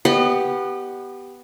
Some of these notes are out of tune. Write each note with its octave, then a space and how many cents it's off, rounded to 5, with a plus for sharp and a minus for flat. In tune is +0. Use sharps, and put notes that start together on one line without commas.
B3 +0 G4 -5 D#5 -40